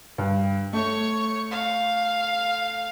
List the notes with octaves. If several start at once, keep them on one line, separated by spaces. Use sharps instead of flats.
G2
A3 C#5 C#6
F5